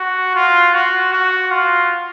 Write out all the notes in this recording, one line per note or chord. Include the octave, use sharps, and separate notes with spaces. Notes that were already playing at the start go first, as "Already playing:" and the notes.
Already playing: F#4
F4
F#4
F#4
F4